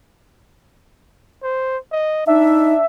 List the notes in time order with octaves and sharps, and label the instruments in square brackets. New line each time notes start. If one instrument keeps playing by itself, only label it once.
[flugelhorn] C5
D#5
[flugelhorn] D4 [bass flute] D#4 [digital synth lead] E5